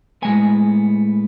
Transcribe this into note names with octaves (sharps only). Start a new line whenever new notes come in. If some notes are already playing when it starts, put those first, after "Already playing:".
A2 G#3 B3 G#5